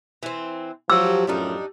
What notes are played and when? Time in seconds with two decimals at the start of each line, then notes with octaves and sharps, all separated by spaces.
0.23 E3 C4
0.90 F3 F#3 G4 E6
1.27 F#2 A2 F3 G3 D4 D#4